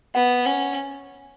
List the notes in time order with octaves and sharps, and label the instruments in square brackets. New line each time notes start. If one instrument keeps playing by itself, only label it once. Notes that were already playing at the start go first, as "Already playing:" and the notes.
[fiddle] B3 [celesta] F#5
[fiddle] C#4